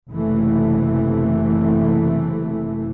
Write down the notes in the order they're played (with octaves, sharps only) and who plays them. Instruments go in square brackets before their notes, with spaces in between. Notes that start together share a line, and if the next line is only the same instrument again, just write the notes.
[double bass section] F#1 C3 E3 A3